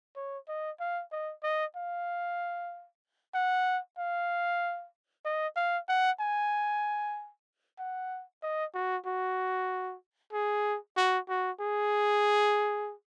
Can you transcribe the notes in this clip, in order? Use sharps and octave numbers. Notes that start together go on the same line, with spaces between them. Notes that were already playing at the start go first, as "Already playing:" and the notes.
C#5
D#5
F5
D#5
D#5
F5
F#5
F5
D#5
F5
F#5
G#5
F#5
D#5
F#4
F#4
G#4
F#4
F#4
G#4